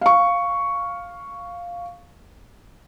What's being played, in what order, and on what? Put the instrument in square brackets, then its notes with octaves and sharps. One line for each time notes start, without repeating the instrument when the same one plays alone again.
[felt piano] F5 C#6